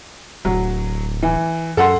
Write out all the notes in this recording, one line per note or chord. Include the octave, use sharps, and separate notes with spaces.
D1 F#3
E3
F#2 A4 F#5 C6